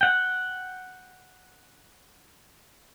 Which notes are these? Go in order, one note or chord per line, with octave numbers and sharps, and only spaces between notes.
F#5 G5